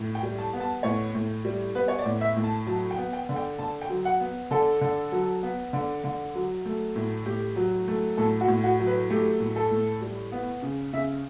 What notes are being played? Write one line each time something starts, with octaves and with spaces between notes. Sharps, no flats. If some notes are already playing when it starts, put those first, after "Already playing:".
Already playing: A2
G5
G3
A5
B3
A5
A2 C#5
A2
G3
B3 B4
C#5
D5
A2
E5
A2
A5
F#3 A5
G5
B3
G5
D3
G5
D3 A5
G5
F#3
F#5
B3
D3 A4
D3
F#3
B3
D3
D3
F#3
A3
A2
A2 G4
F#3
A3
A2 A4
F#4
A2
F#4
F#3
B4
A3 G4
A2
A4
A2
G3
B3
C#3
C#3 E5